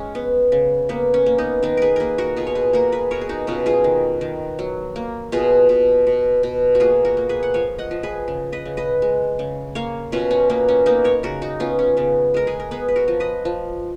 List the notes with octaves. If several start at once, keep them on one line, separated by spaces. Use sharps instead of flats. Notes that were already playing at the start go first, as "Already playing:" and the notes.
Already playing: G#3 C#4
B3
C#3
A#3 B3
C#4
A#3
B3 D#4
D#3 B3 D#4
G#4 A#4 B4
A#3 G#4 A#4 B4
F#4 A#4
B2 F4 G#4
C#5
G#4 B4
A#3 F#4 A#4
G#4 B4
B2 A#4 C#5
G#4
D#4 F#4
B2 C#4 F4
F4 G#4
D#3
D#3
F#3
A#3
B2 F4 G#4
B2
B2
B2
F#4
A#3 F4 G#4
F#4 A#4
A#3
G#4 B4
F#5
F3 C#5 F5
D#5 F#5
F3
G#4 B4
C#3
B4 D#5
C#3
B4 D#5
G#3
C#3
A#3 C#5 F5
B2 C#4 F4
C#4
A#3 B3
C#4
A#3 B3 D#4
A#4 C#5
C#3 F#4 A#4
D#4 F#4
B3 C#4 F4
C#4
C#3 B3
G#3 A#4
G#4 B4
A#4
B3 G#4 B4
B4
F#4 A#4
F3
B4 D#5
F3